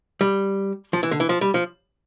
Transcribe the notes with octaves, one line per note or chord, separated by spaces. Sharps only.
G3
F3
E3
D3
E3
F3
G3
F3